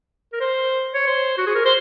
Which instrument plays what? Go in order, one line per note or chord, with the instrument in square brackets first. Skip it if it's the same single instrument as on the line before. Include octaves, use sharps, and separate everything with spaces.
[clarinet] A#4
C5
C#5
C5
F#4
G#4
A#4
C5